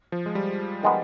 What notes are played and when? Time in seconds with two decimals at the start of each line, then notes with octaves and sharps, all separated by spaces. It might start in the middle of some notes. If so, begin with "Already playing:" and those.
0.12 F3
0.26 G#3
0.35 G3
0.83 D#3 G#3 B3